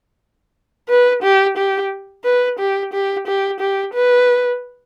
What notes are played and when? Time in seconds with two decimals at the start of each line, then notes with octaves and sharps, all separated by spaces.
0.89 B4
1.23 G4
1.57 G4
2.25 B4
2.60 G4
2.93 G4
3.27 G4
3.60 G4
3.94 B4